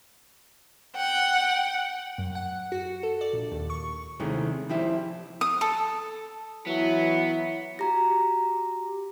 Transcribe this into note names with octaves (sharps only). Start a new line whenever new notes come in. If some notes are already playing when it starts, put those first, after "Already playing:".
F#5 G5
F#2
F#5
F#4
A4
D5
A#1
D#2
C#6
C3 D#3 G#3 A3 C#4 E4
F3 E4 G4 E5
D#6
A4
E3 F#3 B3 E4
F#4 G4 A#5 A#6